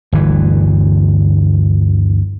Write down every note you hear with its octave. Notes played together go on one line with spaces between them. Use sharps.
G1 D2 E3